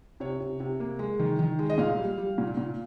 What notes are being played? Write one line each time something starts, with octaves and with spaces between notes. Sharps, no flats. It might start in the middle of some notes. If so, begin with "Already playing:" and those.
C3 C#5
C3
C3
A#3
G#3
D#3
D#3
G#3
D#5
A#2 F5
G3
G3
A#2
A#2